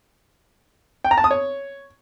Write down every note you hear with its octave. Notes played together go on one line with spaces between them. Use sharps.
G5
A#5
A5
D#6
C#5